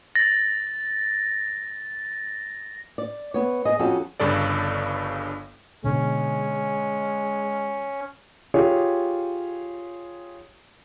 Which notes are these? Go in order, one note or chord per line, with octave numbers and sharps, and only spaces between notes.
A6 A#6
D5
B3 C#5
G#4 D#5
F2 C#4 F#4 G#4 A4
G1 G2 C#3 A4 D5
B2 D3 G#3 C#4
F4 G4 G#4 C#5